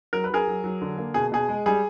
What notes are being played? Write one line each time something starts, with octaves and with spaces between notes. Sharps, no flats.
F#3 A#4
B4
F#3 G#4 A#4
F#3
F#3
D3
A#3
B2 G#4
B2 G#4
G#3
G3 G#4